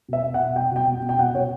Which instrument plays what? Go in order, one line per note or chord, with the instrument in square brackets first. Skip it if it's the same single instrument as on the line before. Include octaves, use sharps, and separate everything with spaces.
[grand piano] B2 E5
B2
F#5
B2
B2 G5
B2 G5
B2
B2
G5
B2 F#5
B2 C#5